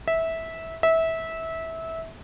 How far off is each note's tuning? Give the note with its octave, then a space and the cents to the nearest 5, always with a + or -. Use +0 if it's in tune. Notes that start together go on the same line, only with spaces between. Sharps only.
E5 -15
E5 -20